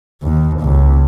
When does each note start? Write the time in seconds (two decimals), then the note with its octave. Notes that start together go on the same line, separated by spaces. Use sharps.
0.23 D#2
0.60 C#2